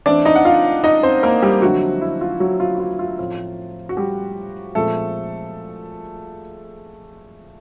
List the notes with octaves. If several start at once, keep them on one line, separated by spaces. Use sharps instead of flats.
E3 A3 C4 D4 D5
D#4 D#5
F#5
F4 F5
D#4 D#5
C4 C5
A#3 A#4
G3 G4
D3 F3 F#3 A3 C4 F#4
E4
F4
F#3 F#4
F4
F#4
F4
F4
A2 F3 A3 C4 F4
F#4
G3 G4
A#2 F3 G#3 A3 C4 A4